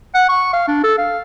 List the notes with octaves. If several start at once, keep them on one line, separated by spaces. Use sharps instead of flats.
F#5
C#6
F5
D4
A4
F5